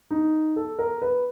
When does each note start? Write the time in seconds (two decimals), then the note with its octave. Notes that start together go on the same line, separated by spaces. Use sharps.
0.11 D#4
0.56 A4
0.79 A#4
1.02 B4